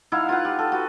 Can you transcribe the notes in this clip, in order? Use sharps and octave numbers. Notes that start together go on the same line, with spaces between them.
D#4 E4 F5 F#5
F4 B4 F#5
G4
A4
F#4 B4